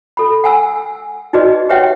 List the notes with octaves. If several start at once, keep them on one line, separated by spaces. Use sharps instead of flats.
A4 B5
F#5 G#5 E6
D#4 F#4 G#4 B4 D5 D#5
G4 B4 C#5 E5 F#5 G5